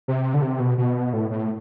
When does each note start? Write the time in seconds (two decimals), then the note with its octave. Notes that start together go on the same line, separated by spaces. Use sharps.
0.08 C3
0.34 D3
0.42 C3
0.60 B2
0.78 B2
1.13 A2
1.30 A2